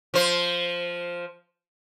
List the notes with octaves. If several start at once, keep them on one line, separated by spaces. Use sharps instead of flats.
F3 C5